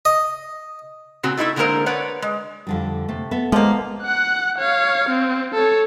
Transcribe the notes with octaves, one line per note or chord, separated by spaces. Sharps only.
D#5
A#2 C#3 C4 F#4
A3 D#4 E4 A4 E5
D3 G#3 A#3 B3 A#4 C5
B4 C#5 D5 F#5
G#3
F2 D3 G3
C3 A3
B3 A4 E5
F3 G#3 A#3
F#5 F#6
C#5 F5
C4
A4 C#5